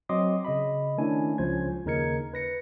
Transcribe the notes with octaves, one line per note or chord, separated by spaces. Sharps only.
F#3 C4 D#5 C6 D6 D#6
C#3 D#5 B5
D#3 A3 C#4 D4 E4 G#5
C#2 F3 C#4 C5 G#6
D#2 C#3 D#4 A#4 G#6 C#7
B4 A#6 C#7